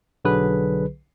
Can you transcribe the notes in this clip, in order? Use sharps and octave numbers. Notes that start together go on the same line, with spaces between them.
B1 D3 F#3 G#4 B4